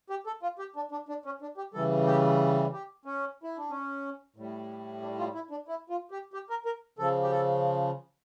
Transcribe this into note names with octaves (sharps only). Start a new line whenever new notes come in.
G4
A4
F4
G4
D4
D4
D4
C#4
D4
G4
C#3 E3 G3 A4
G4
G4
C#4
E4
D4
C#4
A2 G3
D4
F4
E4
D4
E4
F4
G4
G4
A#4
A#4
C#3 F3 A4
G4
A4